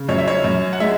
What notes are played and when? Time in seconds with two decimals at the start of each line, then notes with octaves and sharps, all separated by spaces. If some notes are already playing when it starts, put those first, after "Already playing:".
Already playing: C#3
0.09 F#2 C#5
0.18 E5
0.28 C#5
0.44 F#2
0.73 F#5
0.80 G#3 E5